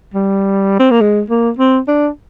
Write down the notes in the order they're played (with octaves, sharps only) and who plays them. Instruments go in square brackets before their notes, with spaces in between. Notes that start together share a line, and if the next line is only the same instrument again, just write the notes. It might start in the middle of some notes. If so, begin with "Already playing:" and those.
[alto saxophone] G3
C4
A#3
G#3
A#3
C4
D4